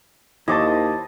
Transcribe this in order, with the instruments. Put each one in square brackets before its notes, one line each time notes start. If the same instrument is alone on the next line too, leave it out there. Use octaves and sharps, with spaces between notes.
[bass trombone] D#2 [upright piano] D#3 C#6 D6 [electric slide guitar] E4 C5 A5 [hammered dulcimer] D#5